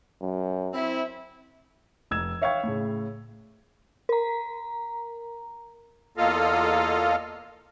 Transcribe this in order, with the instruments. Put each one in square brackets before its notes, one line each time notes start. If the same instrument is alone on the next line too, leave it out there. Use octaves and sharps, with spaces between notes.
[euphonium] F#2
[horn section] C4 E4
[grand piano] F1 E6 G#6 E7
C#5 E5 F5 G5 C#6 G#6
A2 C#3
[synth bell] A#4 A#5
[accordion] E2 A#3 F4 A4 D#5 F5